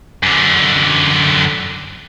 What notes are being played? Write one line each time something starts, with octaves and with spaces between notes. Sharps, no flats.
F#2 D3